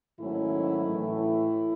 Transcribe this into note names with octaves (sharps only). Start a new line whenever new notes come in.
G#2 D#3 F#3 A3 C#4 E4
A2 E3 A3
E4